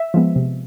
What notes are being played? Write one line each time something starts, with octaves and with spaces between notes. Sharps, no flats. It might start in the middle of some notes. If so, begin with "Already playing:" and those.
Already playing: E5
F3 G#3 B3
C3